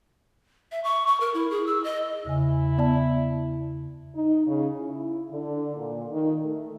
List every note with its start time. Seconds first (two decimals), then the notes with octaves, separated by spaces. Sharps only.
0.72 E5
0.84 C#6
1.07 C#6
1.20 A#4
1.34 E4
1.51 G#4
1.67 E6
1.84 D#5
2.25 E2 C#3 E4 G#5
2.78 B3 D5 A5
4.15 D#4
4.47 C#3
4.78 E4
5.31 D3
5.76 A#2
6.11 D#3
6.44 A3